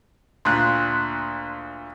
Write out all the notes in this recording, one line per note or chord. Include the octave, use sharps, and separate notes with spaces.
D2 A#2 C6 F#6